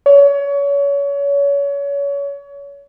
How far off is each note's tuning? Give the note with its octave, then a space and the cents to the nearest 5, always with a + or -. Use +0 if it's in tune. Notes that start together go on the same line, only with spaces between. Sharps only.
C#5 +30